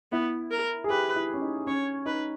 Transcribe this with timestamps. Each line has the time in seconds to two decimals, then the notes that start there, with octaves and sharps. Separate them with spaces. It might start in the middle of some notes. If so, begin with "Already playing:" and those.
0.12 B3 E4
0.51 A#4
0.84 G#4
0.90 G4 B4
1.16 E4
1.33 C#4
1.42 D#4
1.67 C#4 C#5
2.05 D#4 B4